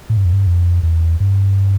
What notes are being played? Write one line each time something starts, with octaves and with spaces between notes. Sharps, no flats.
A2
G2
F2
G2
F2
E2
G2